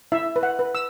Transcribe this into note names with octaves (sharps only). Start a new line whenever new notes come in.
E4 E5
B4
F#5
B4
E6